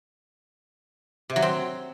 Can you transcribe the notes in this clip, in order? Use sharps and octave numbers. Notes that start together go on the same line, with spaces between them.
C3
F#3
C4